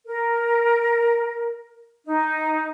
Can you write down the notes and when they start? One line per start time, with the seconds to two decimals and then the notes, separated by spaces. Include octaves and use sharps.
0.07 A#4
2.07 D#4